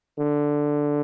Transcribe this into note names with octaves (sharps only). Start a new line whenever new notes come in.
D3